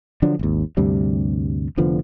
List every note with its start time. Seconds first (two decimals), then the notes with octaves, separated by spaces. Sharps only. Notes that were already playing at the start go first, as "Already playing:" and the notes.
0.22 D3 F3 F#3 D4
0.39 G#1 D#2
0.77 D2 G2 C3 G3
1.77 F1 D3 F3 B3